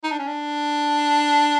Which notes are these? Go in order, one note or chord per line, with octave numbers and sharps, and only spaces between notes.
D#4
D4
C#4
D4